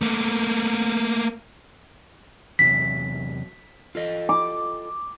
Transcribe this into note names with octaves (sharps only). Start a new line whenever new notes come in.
A3 A#3
E2 C3 F#3 B6
F4 A4 D#5
D6